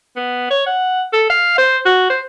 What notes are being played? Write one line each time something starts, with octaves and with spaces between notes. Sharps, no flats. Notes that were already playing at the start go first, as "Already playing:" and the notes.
B3
C#5
F#5
A4
F5
C5
F#4
C5